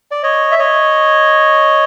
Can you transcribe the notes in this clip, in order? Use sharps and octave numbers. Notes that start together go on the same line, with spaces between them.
D5
C#5 D#5
E5
C#5 D#5